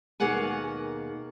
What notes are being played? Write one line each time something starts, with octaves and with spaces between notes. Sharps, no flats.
D#2 B2 A#3 G#4 F#5 G#5